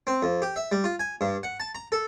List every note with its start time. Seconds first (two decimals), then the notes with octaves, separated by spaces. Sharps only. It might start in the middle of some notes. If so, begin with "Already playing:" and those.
0.07 C4
0.23 F2
0.42 G4
0.56 E5
0.72 G3
0.84 F4
1.00 G#5
1.21 G2
1.43 F#5
1.60 A5
1.75 A#5
1.92 A4